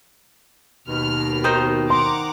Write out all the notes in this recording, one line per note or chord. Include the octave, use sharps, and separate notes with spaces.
D#2 B2 F6
D#3 D#4 C5
F#5 A#5 C6 D6